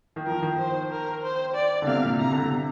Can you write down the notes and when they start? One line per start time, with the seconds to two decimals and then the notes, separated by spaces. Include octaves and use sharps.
0.16 D#3
0.26 F3 A#4
0.42 D#3
0.58 C5
0.91 A#4
1.23 C5
1.55 D5
1.82 D3
1.87 C3 F5
2.03 A#2
2.20 C3 A#5
2.32 D3
2.43 C3